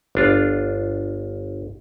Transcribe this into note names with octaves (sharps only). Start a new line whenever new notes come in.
G1 D4 F4